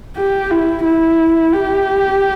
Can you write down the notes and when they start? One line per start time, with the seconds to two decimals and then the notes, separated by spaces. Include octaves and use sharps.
0.17 G4
0.51 E4
0.84 E4
1.53 G4